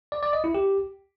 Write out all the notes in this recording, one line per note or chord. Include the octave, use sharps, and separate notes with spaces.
D5
D5
D#5
E4
G4